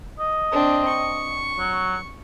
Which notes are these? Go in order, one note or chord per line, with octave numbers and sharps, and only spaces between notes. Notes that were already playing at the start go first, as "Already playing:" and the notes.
D#5
C4 D4
C#6
F#3